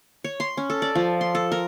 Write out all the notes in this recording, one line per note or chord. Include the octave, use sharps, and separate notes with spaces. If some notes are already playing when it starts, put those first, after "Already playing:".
C#5
C6
C#4
A4
D5
F3
C6
A4
A#4